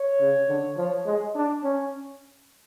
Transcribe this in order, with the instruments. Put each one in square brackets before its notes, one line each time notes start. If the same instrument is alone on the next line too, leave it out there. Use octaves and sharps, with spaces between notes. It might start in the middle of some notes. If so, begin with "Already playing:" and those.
Already playing: [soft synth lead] C#5
[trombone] C#3
D3
F3
G#3
D4
C#4